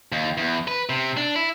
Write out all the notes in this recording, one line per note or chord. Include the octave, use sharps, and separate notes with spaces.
D#2
E2
B4
C3
D4
E4